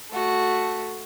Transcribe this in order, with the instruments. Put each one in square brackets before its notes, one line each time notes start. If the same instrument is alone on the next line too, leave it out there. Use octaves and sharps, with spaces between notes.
[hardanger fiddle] A3 F#4